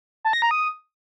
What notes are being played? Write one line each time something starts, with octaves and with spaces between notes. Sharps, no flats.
A5
A#6
A#5
D#6